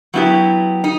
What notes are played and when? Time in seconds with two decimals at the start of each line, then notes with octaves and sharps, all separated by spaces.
0.14 F#3 B3 E4 G4
0.84 D#4